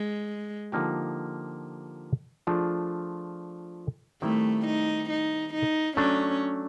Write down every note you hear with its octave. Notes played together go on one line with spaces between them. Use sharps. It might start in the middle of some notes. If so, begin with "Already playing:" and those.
Already playing: G#3
D3 F3 A#3 D#4 G4
F3 A3 D4 F4 G#4
D#3 G3 A3 C4 E4
D#4
D#4
D#4
F#3 A3 C#4 D4